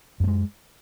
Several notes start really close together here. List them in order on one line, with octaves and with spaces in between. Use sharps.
F#2 A3 G#3